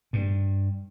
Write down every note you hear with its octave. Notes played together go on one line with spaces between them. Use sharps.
G2